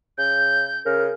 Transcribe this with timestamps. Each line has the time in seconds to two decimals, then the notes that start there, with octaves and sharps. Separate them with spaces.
0.18 C#3 G6
0.86 C#3 A#4